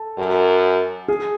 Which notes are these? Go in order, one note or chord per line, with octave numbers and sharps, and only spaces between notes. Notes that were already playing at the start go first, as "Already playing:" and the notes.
Already playing: A4
F#2
G#4